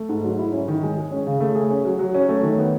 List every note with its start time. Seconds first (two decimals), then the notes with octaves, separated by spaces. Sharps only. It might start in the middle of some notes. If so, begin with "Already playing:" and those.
Already playing: A3
0.09 G#2
0.24 F#3
0.39 E4
0.52 C#4
0.68 D#3
0.83 G#3
0.98 G#4
1.11 C#4
1.27 C#3
1.40 A3
1.55 G#4
1.70 C#4
1.85 F#3
1.99 F#3
2.14 C#4
2.29 A3
2.43 D#3
2.58 B3